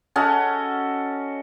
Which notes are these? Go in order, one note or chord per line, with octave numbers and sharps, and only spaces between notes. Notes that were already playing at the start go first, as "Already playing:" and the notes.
C#4 F#4 A4 D#5